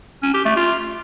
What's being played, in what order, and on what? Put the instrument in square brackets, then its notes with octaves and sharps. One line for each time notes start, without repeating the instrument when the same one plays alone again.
[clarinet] C#4
G4
A3
F4